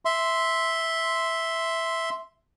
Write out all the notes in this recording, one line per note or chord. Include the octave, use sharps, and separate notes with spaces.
E5 C6